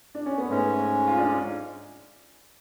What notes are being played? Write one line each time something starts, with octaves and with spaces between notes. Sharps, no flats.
D4
C#4
B3
G#2 G#3 A3 C#4
F4
D4